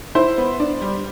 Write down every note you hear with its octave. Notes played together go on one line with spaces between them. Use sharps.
E4 C5
B3
D4
G3